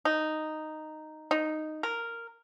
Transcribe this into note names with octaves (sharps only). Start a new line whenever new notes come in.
D#4
D#4
A#4